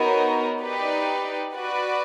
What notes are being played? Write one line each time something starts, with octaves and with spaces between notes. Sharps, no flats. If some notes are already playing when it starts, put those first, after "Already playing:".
Already playing: B3 D#4 F#4 A#4 C#5
D#4 G4 B4 D5
F#4 B4 D5